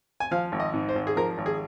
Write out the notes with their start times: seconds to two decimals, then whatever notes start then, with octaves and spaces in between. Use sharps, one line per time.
0.20 G#5
0.31 F3 F5
0.52 G#1
0.60 D#5
0.74 G#2
0.89 C5
0.95 G#1
1.07 G#4
1.16 F3 A#4
1.38 G#1
1.46 G#4